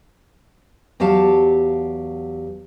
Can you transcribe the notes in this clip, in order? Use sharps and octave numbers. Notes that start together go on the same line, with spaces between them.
E2 F#3 G4 F5 A5